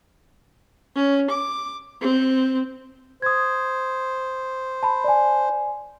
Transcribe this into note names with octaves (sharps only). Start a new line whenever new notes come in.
C#4
D6
C4
C5 D#6 G#6
A5 B5
D5 G#5